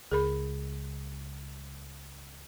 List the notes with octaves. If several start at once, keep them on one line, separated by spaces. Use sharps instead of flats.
C#2 G#4 A#4 B5